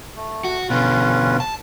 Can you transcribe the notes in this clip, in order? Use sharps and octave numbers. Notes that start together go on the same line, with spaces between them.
A3
F#4
B2 D3 C#4 F4 B4
A5